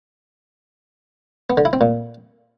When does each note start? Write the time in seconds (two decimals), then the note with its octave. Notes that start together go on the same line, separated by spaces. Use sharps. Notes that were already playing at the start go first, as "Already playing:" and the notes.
1.50 B3
1.57 D3
1.65 E4
1.73 C4
1.81 A#2